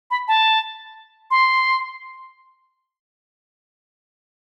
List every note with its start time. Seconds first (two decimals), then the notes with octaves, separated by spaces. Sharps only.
0.11 B5
0.28 A5
1.31 C6